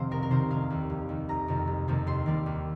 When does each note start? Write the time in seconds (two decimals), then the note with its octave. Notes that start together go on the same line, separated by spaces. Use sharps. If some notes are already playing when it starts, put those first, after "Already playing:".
Already playing: F1 C3 D#3 C4 D#4 C5 F5
0.11 C2 A#4
0.23 A#4
0.30 C3 D#3 C5
0.50 F1 F5
0.70 D#2 D#3
0.90 F1
1.09 D#2 D#3
1.29 F1 A#5
1.48 F2 C3 D#3 A#3
1.67 F1
1.88 F2 C3 D#3 A#3
2.07 D#2 C6
2.26 D#3 G3 A#3
2.46 D#2